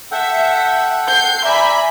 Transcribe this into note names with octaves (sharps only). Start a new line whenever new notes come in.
A4 E5 F#5 G5
G6 C7
D5 E5 G#5 A#5 B5